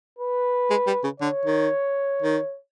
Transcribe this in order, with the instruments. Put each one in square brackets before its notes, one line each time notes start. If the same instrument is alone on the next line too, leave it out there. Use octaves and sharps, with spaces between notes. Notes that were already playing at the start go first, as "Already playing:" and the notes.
[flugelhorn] B4
[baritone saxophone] G#3
G3
C#3
[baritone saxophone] D3 [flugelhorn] C#5
[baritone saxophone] D#3
D#3